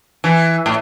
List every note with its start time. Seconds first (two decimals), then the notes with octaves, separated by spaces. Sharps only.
0.24 E3
0.66 A2